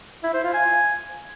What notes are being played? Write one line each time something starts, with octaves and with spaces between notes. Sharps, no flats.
E4
C5
F4
G#5